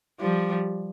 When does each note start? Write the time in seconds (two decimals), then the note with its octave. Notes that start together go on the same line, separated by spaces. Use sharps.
0.20 F3 G3